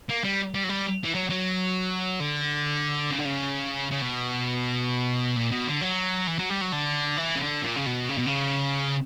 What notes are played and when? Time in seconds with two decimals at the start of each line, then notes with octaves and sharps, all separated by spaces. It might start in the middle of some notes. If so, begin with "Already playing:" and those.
0.09 A#3
0.24 G3
0.55 G3
0.64 F#3
0.69 G3
1.04 E3
1.15 F#3
1.30 F#3
2.20 D3
3.11 C#3
3.18 D3
3.25 C#3
3.91 C#3
4.01 B2
5.36 A#2
5.52 B2
5.67 D3
5.81 F#3
6.27 E3
6.39 F#3
6.50 G3
6.61 F#3
6.72 D3
7.18 E3
7.36 C#3
7.40 D3
7.62 A#2
7.76 C#3
7.86 B2
8.09 C#3
8.18 B2
8.26 C#3